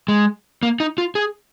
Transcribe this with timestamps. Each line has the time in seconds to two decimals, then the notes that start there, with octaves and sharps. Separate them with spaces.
0.08 G#3
0.63 A#3
0.80 D#4
0.98 F4
1.15 G#4